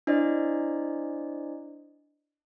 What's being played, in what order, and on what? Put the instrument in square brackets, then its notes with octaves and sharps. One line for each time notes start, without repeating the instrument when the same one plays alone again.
[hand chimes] D4 E4 C5 D5 D#5